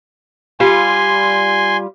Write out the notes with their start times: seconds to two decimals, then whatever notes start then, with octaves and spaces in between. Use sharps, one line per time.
0.60 G3 F4 G#5 C6